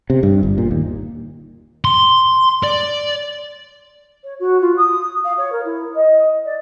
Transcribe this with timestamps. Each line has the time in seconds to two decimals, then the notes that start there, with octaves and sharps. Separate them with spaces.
0.10 C3
0.23 G2
0.43 G1
0.58 A#2
0.71 D#2
1.85 C6
2.64 D5
4.23 C#5
4.39 F#4
4.60 F4
4.77 D#6
5.24 F5
5.37 C#5
5.52 A#4
5.64 E4
5.95 D#5
6.44 D5